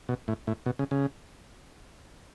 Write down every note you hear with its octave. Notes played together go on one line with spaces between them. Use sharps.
B2
A2
A2
B2
C#3
C#3